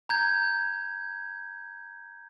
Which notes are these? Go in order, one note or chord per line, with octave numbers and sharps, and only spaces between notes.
A#5 G6 G#6